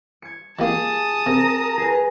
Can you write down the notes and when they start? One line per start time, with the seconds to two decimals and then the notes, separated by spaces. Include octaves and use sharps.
0.22 G#6 C#7
0.59 D#3 A#3 F4 G4 G#4 A5 D#6
1.26 C3 A#4 A#5
1.77 G#4 B4